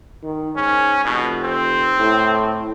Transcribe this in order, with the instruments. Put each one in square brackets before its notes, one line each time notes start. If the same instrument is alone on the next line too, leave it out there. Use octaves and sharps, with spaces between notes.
[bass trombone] D#3
[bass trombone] G#2 [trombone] C#4
[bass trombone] F1 [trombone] B2
[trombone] C4
[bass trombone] A2